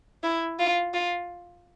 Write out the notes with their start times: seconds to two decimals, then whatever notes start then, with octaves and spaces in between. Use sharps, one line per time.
0.24 E4
0.59 F4
0.94 F4